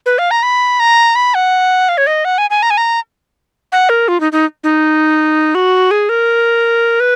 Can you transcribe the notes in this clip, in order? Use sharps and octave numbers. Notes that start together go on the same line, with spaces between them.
B4
F5
A#5
B5
A#5
B5
F#5
F5
C#5
D#5
F#5
G#5
G#5
A#5
G#5
A#5
F#5
A#4
F4
D#4
D#4
D#4
F#4
G#4
A#4
B4